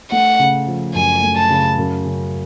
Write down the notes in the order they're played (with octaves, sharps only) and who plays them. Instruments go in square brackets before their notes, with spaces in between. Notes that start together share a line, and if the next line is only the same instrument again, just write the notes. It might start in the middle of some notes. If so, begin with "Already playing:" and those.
[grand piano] A3 [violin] F#5
[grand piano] C#3
F3
[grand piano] F#2 [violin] G#5
[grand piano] A3
[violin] A5
[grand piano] C#3
F#2
C#3